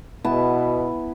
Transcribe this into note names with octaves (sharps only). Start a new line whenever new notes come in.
B2 B3 E4 A5